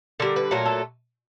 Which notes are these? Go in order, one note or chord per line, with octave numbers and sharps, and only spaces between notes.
D3 G3 A#4
B4
A#2 F#3 A3 A#4
A4